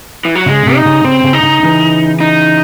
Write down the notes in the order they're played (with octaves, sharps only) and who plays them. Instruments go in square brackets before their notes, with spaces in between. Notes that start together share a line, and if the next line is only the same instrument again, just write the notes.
[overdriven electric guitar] E3
F#3
[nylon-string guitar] C#3 [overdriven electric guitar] G#3
[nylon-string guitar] C3
[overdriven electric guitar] D#4
[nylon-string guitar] C#3
[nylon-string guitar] C#3 [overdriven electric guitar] C4
[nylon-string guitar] C#3
[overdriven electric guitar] D#4
[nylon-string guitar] C#3
C#3 E3
[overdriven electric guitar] D#4